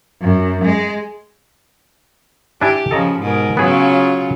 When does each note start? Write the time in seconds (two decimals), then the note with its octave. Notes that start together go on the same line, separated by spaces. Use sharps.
0.22 F#2
0.64 G#3
2.61 D4 E4 G4 G#5
2.91 C#3 F3 A4 D#5 A#5
3.20 G#2 B2 A#4
3.57 C#3 F#3 B3 F4 G#4